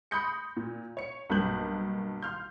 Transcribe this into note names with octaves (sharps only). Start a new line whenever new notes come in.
B5 C6 D#6 G6 A#6 C#7
A#2
C#5 C#7
B1 G2 A#3 F#6 G6 F#7
C6 F6 G6